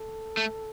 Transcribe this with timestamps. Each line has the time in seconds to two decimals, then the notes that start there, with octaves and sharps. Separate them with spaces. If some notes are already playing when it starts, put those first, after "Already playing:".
Already playing: A4
0.37 A3